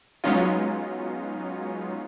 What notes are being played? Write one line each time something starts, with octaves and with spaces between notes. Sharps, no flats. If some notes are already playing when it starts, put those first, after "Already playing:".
F#3 G#3 B3 C#4 D#4 F4